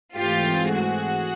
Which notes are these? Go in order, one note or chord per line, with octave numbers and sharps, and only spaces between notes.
G#2 E3 A3 C4 F4 G4
F#4 G#4